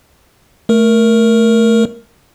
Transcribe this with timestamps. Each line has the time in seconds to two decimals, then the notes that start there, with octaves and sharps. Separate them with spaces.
0.69 A3 A#4